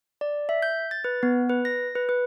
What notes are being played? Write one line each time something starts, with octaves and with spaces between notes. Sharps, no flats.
D5
E5
G6
A6
B4
B3
B4
A#6
B4
B4